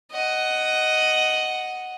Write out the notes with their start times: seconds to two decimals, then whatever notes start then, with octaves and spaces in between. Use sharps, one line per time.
0.11 D#5 F#5